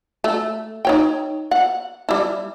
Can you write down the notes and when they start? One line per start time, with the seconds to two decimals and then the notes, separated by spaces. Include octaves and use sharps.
0.24 A3
0.85 D#4 C#5 G5
1.51 F#5
2.09 G3 E4